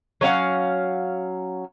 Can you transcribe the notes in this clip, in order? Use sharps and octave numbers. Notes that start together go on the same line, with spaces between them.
F#3 C#4 F5 F#5